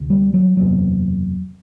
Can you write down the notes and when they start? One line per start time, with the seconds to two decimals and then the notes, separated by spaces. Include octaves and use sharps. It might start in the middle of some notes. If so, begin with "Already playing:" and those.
Already playing: D2 C3
0.10 G3
0.34 F#3
0.57 F#1 E2 C3 F#3